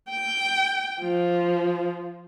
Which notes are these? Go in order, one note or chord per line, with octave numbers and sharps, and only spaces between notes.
G5
F3